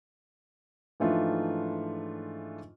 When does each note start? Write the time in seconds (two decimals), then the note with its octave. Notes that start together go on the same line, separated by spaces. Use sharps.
1.00 G#2 E3 F3 A3 D4 F4